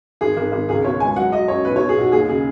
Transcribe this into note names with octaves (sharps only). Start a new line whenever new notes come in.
G#1 G#4
G#1
G#1
C#2 G#4
B2 C#5
G#3 G#5
F#3 F#5
F#3 D#5
F#2 C#5
B1 B4
C#5
B2
G#4
B1 F#4
D#2 G#4
C#3 G#4